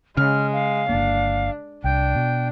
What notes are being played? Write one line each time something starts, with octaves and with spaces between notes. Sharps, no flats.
C#3 G#3 F6
F5
G1 A#3 D4
C2 D4 G5
B2